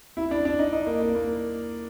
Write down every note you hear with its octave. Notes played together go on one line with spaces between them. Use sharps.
E4
D4
D4
D#4
D#4
A#3
A#3
A#3